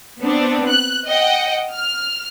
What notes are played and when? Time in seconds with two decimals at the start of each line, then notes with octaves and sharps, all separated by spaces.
0.20 B3 C4 D4
0.69 F#6
1.06 D#5 F#5 G5
1.74 F6